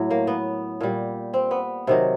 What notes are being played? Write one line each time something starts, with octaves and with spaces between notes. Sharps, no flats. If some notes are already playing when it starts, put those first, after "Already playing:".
Already playing: A2 F#3
A#3
B3
A#2 G3
C4
B3
C3 D#3 F#3